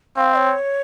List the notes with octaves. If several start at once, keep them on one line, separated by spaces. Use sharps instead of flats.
C4 F5
C#5